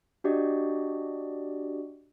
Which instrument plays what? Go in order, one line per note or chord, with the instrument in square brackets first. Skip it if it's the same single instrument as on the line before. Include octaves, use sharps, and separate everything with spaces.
[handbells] D4 F#4 G4 D5 D#5